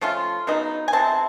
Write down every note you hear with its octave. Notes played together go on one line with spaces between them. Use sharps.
F3 A3 C#4 F4
C#3 F#3 B3 D#4
G#5
C3 E3 G#3 C4 A5